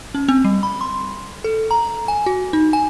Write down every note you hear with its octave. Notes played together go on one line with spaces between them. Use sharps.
C#4
C4
G3
B5
C6
A4
A#5
G#5
F#4
D#4
G#5